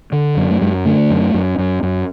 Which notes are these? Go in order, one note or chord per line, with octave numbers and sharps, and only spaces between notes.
D3
F#2
A3
F#2 G#3
D3 A3
F#2
F#2
F#2
F#2